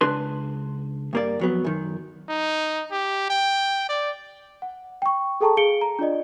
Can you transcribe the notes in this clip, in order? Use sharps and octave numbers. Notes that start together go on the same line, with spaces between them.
C#2 D4 B4 C6
G2 A#3 D5
F2 F#3 B3
F#2 D#3
D#4
G4
G5
D5
F#5
G5 C#6
G#4 A4 G5 A5 A#5 C#6
G#4 F5 C#7 D7 G7
A#5
D4 F4 D5 D#5